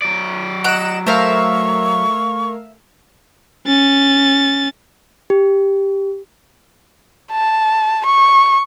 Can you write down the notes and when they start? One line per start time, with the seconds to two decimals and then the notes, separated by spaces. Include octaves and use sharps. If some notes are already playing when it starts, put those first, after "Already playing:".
0.02 F#3 D5
0.64 D#5 F#5 A#5 E6 F#6 D7 E7
1.07 A3 A#4 C5 E5 F5 C#6
3.67 C#4 A6
5.30 G4
7.32 A5
8.06 C#6